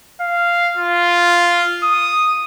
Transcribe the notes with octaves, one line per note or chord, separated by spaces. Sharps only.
F5
F4
D#6